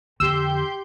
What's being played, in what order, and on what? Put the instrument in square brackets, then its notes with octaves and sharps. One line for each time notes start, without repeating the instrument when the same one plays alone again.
[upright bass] F2 [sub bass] D3 [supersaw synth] G4 C6 G6 [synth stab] E6